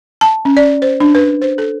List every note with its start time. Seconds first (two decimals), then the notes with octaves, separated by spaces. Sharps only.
0.21 A5
0.45 C#4
0.57 D5
0.82 C5
1.00 D4
1.15 B4
1.42 C5
1.58 A4